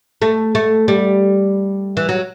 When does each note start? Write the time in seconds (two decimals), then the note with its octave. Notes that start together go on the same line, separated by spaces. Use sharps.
0.22 A3
0.55 A3
0.88 G3
1.97 E3
2.09 F#3